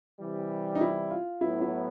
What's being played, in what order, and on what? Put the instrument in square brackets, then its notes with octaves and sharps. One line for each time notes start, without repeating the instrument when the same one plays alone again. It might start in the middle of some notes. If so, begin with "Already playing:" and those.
[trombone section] C3 E3 G3
[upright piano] D#4
E4
F4
[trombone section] A2 F#3 B3 [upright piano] E4
[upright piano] E4